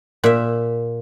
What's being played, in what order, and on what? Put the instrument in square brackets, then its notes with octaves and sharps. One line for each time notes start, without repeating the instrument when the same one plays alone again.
[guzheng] A#2 E5